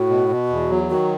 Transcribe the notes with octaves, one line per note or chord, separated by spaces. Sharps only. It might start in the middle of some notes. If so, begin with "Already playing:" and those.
Already playing: A2 F#4
B2
B2
E2
F#3
D#3 F#4